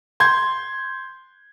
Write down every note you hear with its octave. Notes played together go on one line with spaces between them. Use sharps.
C6 G6 G#6